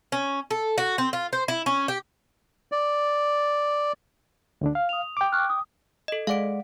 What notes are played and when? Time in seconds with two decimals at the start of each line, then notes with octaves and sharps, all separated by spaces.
0.12 C#4
0.50 A4
0.78 F#4
0.98 C4
1.13 F4
1.33 C5
1.48 E4
1.66 C#4
1.88 G4
2.72 D5
4.61 D2 D3 D4
4.75 F5
4.89 D#6 F7
5.17 G5 D6
5.32 C#6 F6 F#6
5.49 D#6
6.08 A4 D#5
6.27 G#3 D5 F5 F#5 D7